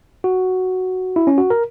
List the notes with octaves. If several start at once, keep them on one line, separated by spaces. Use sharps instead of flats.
F#4
E4
C#4
F#4
A#4